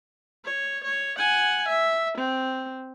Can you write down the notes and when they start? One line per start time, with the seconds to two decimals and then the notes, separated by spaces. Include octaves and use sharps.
0.45 C#5
0.84 C#5
1.18 F#5 G#5
1.69 E5
2.18 C4